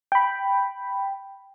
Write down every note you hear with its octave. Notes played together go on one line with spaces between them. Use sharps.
G5 B5